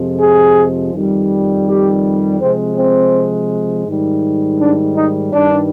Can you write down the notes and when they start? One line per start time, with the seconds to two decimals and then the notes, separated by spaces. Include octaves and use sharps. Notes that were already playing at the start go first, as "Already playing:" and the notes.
Already playing: F2 C3 F3 G#3
0.21 G#4
0.94 F2 D#3 G3
1.67 G4
2.40 C3 F3 G#3 C4
2.77 C4
3.87 G#2 D#3 G3
4.60 D4
4.96 D#4
5.33 G2 D#3 G3 D4